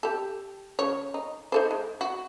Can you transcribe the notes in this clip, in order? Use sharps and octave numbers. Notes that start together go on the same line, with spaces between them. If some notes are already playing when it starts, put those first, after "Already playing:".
G4 A4
C#3 C#5
D#4
D#4 A4 C5
G#3
F#4